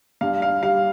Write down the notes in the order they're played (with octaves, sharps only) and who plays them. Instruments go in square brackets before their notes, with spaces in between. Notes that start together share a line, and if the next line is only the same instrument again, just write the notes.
[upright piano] G2 F5
F5
G3 F5